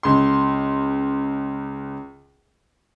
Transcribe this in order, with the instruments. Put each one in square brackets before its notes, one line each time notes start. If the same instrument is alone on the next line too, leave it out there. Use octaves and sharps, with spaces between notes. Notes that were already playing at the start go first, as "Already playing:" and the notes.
[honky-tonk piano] C#2 C6